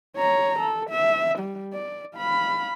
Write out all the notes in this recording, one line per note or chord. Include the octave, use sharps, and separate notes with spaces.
C#5 A#5
A4
E5
G3
D5
F5 B5